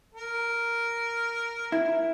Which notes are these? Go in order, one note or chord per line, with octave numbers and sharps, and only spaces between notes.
A#4
E4